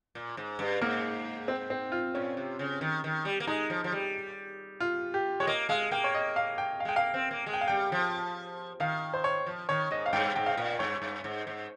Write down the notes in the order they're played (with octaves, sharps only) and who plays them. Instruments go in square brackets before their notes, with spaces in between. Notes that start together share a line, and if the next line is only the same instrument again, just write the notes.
[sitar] A#2
G#2
G2
[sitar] G#2 [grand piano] A#3
[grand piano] C4
C4
F4
[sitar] A#2 [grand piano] C#4
[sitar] C3
C#3
D#3
D#3
G3
A#3
[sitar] G#3 [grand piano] D#4
[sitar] F3
F3
G3
[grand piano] F4
G4
[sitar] G#3 [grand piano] C#5
[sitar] A#3 [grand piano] D#5
[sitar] G#3 [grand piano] F5
[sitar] A#3 [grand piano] G5
[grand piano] C#5
D#5
F5
G5
F5
[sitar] G#3 [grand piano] G5
[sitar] A#3 [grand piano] F5
[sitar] C4
A#3
G#3
[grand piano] G5
F5
[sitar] G3 [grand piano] G5
[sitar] F3
[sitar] D#3 [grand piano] F5
[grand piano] C5
C#5
[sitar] F3
[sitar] D#3 [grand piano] C#5
[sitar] G#2 [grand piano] D#5
[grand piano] F5
[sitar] G2 [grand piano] G5
[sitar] G#2 [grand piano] G5
[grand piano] F5
[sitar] A#2
[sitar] G2 [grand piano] C#5
[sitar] G2
G#2
G#2